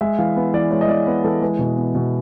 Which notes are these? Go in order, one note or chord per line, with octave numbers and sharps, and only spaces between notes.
G#3 E5
E3 F5
B3
E3 D5
G#3 C#5
D#5
E3 D5
B3
E3 A4
G#3 B4
B2
B3
B2